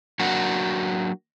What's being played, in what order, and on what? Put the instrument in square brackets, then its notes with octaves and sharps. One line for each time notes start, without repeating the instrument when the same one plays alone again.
[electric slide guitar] F#3 A#3 D4 F#4